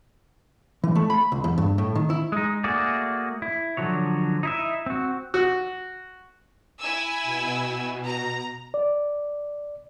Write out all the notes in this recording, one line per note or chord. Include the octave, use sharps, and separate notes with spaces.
E3
A3
B5
C#2
E2
G2
A2
D#3
E4
G#3 D#4
A3 A#3 F#4 G#4 D5
E4
D3 F3 F#3 C#5
D#4 E4 E5
C4 F#4
F#4
E4 G#5 E6
B2
A#5
D5